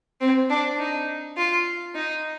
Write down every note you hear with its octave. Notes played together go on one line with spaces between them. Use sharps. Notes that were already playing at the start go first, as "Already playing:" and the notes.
C4
D4
D#4
F4
D#4